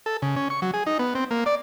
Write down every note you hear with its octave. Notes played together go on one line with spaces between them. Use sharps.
A4
C#3
C#4
C#6
F#3
G#4
D#4
B3
C4
A#3
D5